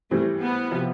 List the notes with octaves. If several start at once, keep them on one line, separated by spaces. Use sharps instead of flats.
E3 G3 A3 C4
B3
C3 F3